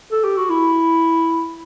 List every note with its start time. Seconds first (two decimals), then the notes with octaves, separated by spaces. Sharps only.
0.12 A4
0.24 G4
0.37 F#4
0.50 E4